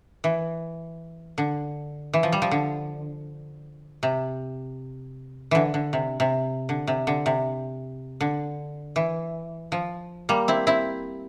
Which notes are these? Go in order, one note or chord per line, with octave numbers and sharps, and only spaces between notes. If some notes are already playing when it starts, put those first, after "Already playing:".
E3
D3
E3
F3
G3
F3
D3
C3
D3 E3
D3
C3
C3
D3
C3
D3
C3
D3
E3
F3
G3 A#3
C4 E4
C4 E4